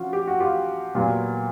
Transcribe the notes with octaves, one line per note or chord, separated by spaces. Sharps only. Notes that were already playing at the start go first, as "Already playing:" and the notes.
Already playing: F3 C#4 F4 F#4
G4
F#4
F4 G4
A#2 F#3 B3 F4 G4